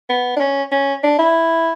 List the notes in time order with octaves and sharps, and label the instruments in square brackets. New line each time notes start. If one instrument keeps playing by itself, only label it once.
[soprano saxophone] B3
D4
C#4
C#4
D4
E4